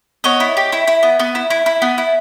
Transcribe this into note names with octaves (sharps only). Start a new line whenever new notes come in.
B3 C#5 D#5
E4
G4
E4
E4
B3
B3
E4
E4
E4
B3
E4